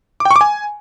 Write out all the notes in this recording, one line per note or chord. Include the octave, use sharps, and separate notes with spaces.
D6
G5
C#6
D6
G#5